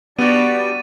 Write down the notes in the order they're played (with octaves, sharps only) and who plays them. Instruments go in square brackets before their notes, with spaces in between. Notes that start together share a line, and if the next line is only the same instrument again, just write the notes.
[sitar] G3 D4 F#4 [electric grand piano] B3 [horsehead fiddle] D5 [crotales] D6 A6 D#7